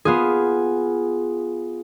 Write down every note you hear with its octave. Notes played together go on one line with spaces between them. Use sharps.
B3 F4 G#4